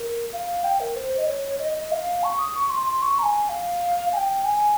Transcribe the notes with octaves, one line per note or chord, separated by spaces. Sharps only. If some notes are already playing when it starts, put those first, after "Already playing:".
Already playing: A#4
F5
G5
A#4
C5
D#5
C#5
D#5
D#5
F5
C#6
D#6
C#6
C6
C6
C#6
A#5
G#5
F5
G#5
G5
G#5